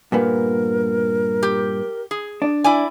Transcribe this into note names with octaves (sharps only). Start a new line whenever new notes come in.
G2 A#2 B3 A#4
G4
G#4
D4
E4 D5 G#5